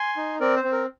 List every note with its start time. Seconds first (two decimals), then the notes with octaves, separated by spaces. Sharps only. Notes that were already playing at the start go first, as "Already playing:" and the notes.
Already playing: G#5 C6
0.17 D#4
0.40 C4 A#4 D5
0.56 C5
0.64 C4
0.72 A#4